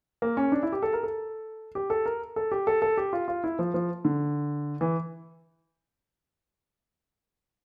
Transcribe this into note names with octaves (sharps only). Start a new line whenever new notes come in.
A#3
C#4
D4
E4
G4
A4
A#4
A4
G4
A4
A#4
A4
G4
A4
A4
G4
F4
F4
E4
F3
F3
D3
E3